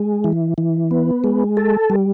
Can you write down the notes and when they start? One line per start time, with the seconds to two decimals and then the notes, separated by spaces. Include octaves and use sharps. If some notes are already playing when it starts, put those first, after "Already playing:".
Already playing: G#3
0.24 E3
0.58 E3
0.91 B3
1.24 G#3
1.57 A4
1.90 G3